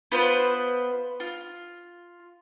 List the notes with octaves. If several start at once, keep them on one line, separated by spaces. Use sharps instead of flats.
B3 F4 B4 C5
F4